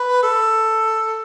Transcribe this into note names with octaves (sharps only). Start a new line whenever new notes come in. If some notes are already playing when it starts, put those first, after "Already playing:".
Already playing: B4
A4